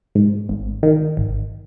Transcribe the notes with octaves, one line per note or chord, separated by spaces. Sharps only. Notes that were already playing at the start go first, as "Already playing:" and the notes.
G#2
G#1
D#3
G#1